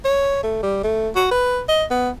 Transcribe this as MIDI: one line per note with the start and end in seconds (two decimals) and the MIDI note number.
0.05 0.40 73
0.43 0.60 57
0.63 0.80 55
0.83 1.09 57
1.15 1.29 66
1.31 1.60 71
1.69 1.84 75
1.90 2.09 59